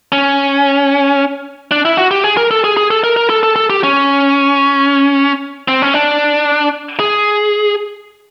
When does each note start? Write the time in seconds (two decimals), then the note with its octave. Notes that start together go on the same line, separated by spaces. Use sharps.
0.12 C#4
1.71 D4
1.85 E4
1.97 F#4
2.11 G4
2.24 G#4
2.37 A#4
2.51 A4
2.64 G#4
2.77 G#4
2.91 A4
3.04 A#4
3.17 A#4
3.30 A4
3.43 A4
3.56 A4
3.70 G4
3.83 C#4
5.68 C4
5.82 C#4
5.94 D4
6.99 G#4